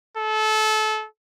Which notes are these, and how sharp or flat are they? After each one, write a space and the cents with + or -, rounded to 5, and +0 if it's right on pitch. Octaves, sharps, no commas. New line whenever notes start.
A4 -25